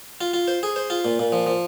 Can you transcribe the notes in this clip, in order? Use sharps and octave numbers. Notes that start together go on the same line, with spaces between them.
F4
F4
C5
G#4
C5
F4
A#2
A#2
F3
F3